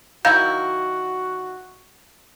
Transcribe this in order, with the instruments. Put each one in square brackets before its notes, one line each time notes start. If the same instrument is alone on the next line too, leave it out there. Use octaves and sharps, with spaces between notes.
[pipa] D#3 F#3 E4 [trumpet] F#4 [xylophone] F5 G6